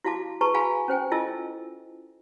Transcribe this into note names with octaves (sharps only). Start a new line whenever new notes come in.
E4 F#4 F5 A5 D6
G#4 B4 A5 A#5 C#6
F#4 G#4 F5 G#5 A#5 B5
C#4 C5 G5 G#5
E4 F4 A4 D#5 A5 E6